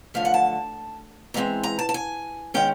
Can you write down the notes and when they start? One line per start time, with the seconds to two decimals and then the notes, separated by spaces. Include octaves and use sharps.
0.14 F#2 D3 F3 A3 F5
0.25 F#5
0.34 A5
1.34 F2 C3 E3 G#3 C4 A#5
1.63 A#5
1.79 A5
1.89 A5
1.94 G#5
2.54 D#3 G#3 C#4 G5